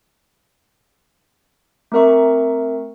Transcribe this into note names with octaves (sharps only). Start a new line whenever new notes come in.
A3 C4 A#4 E5 C#6